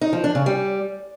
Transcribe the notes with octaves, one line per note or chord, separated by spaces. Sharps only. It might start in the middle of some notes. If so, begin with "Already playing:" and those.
D#4
F3
D4
C#3
G3